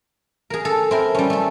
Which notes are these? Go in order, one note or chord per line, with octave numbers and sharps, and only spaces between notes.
G#4 A#4
A4
C4 E4 A#4
G3 C#4
A3 A4